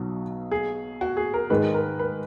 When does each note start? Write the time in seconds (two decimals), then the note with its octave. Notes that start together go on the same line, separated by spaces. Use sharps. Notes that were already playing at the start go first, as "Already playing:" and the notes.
Already playing: B1 B2 F#3
0.51 G#4
1.01 F#4
1.17 G#4
1.34 A#4
1.50 G#2 D#3 G#3 B4
1.74 A#4
1.99 B4